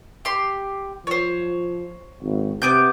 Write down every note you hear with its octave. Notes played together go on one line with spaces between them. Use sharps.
G4 C6
F3 C5 C#5
G#1
C3 B3 D6 G6